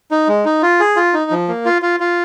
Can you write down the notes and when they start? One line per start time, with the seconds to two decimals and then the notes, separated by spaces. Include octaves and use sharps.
0.11 D#4
0.28 G#3
0.45 D#4
0.62 F4
0.80 G#4
0.96 F4
1.13 D#4
1.31 F3
1.48 A#3
1.65 F4
1.82 F4
2.00 F4